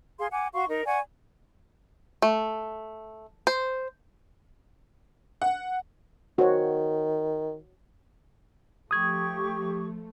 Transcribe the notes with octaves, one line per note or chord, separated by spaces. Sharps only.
G#4 F5 C6
F#5 G#5 D6
F#4 F5 C6 C#6
D#4 A#4
D5 F#5 G#5 C#6
A3
C5
F#5
D#3 F#4 C5 C#5
F3 A3 G4 C#6 D#6 G#6